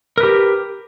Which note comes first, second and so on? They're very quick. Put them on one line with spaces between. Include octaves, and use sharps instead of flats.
A#4 B4 G4